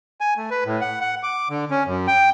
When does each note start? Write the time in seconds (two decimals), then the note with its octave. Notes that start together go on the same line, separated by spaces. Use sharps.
0.21 G#5
0.37 A3
0.51 B4
0.65 A2
0.81 F#5
1.01 F#5
1.23 D6
1.50 D3
1.71 C#4
1.87 F#2
2.07 G5